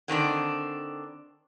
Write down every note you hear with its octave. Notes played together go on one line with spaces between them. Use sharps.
D3 D#3 C4 D4